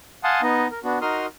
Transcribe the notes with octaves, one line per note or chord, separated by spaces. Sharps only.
F5 F#5 G#5 A5 C6 D#6
B3 D#4 D#5
A#4
B3 D4 F#4
D#4 F#4 A#4 C6 D#6 F6